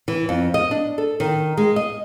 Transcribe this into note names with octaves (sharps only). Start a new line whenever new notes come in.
E3
F2
D#5
D4
A4
D#3
G#3
D#5